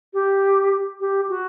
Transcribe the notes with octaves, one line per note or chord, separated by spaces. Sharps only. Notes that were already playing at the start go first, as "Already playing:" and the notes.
G4
G4
F#4